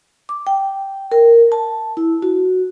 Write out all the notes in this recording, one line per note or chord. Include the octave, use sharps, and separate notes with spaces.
D6
G5
A#4
A5
E4
F#4